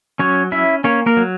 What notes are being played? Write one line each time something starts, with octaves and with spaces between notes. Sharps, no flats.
F#3 C#4 C#5
C#4 E4 E5
A#3 C#4 C#5
A#3 A#4
F#3